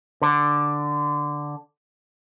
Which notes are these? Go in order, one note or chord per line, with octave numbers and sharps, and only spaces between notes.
D3